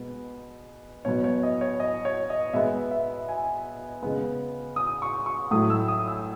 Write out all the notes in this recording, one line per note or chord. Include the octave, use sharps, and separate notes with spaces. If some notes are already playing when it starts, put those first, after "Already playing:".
Already playing: B2 G#3 B3
B2 F#3 B3 C#5
C#5
D#5
C#5
D#5
C#5
D#5
B2 G#3 B3 E5
E5
G#5
C#3 G#3 B3
D#6
C#6
C#6
A2 F#3 A3 D#6
E6
D#6
E6